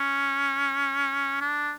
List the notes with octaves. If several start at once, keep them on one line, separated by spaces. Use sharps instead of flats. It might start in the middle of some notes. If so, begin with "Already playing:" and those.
Already playing: C#4
D4